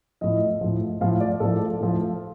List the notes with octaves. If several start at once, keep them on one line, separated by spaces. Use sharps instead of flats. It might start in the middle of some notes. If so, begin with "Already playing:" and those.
A2 F3 D#5
A2 F3
A2 F3 F5
D5
A2 F3 A4
A2 F3